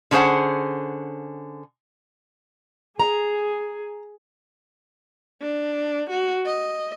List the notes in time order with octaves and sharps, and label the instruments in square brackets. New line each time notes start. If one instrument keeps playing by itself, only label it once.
[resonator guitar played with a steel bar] D3 C#4 G#4 C5 F#5
[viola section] G#4 [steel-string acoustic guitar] A#5
[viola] D4
F#4
D#5